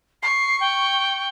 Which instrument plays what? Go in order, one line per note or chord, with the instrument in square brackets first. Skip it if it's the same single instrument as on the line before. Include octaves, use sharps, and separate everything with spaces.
[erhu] C#6 [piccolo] C7
[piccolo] G5